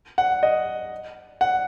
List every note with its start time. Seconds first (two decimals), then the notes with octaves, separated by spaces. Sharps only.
0.18 F#5
0.43 D#5
1.41 F#5